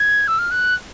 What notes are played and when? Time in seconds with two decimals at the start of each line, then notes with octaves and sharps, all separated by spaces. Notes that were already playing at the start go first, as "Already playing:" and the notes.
Already playing: G#6
0.28 E6
0.39 F6
0.51 F#6